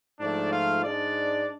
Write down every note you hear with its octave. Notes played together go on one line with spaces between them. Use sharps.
G#2 F3 A3 D4 D5
F4 F5
G#2 G#3 D4 D5